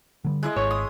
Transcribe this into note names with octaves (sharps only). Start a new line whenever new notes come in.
D3 F#3 G3
G#3 E4 D#5
G#1 C#5
D#6